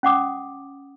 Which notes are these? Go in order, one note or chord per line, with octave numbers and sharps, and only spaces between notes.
C#4 F#5 D6 D#6